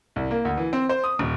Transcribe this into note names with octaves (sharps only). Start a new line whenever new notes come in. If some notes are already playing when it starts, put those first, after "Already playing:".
C2
A#3
D2
E3
C4
C5
D#6
D#1